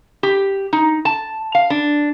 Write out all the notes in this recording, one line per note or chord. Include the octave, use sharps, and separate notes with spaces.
G4
D#4
A5
F5
D4